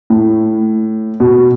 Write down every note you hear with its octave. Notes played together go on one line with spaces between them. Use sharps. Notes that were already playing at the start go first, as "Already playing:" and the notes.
A2
B2